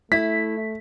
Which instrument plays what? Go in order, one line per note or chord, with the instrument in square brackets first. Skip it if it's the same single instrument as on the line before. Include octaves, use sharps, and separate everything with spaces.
[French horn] A3 [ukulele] E4 [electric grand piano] B6